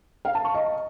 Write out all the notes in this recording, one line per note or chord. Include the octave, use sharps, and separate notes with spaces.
F5
A5
C#6
D#5